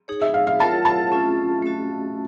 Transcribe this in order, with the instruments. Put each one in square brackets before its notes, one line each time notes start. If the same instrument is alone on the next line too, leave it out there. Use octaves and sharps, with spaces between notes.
[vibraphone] D#4 G#4 C#5
[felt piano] E5
F5
F5
[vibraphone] F4 A#4 C#5 F#5 [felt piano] A5
[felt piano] A5
[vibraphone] A3 C#4 F4
A3 C#4 F#4